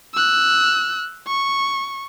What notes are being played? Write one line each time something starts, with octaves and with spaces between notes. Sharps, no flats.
E6 F#6
C#6